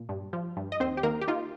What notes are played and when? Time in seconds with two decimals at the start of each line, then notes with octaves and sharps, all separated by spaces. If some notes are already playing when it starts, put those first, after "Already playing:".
Already playing: A#2
0.09 G2
0.33 F3
0.57 G2
0.72 D#5
0.80 D#2 C4 C5
0.97 G4
1.03 D#3 A#3 A#4
1.21 G4
1.28 D#4 F4